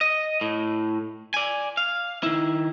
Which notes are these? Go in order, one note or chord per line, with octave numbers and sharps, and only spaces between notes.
D#5
A2
D5 G#5
F5
D#3 E4